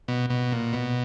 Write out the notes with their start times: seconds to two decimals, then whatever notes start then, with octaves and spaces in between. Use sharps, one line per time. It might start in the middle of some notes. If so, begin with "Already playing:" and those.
0.08 B2
0.30 B2
0.52 A#2
0.73 B2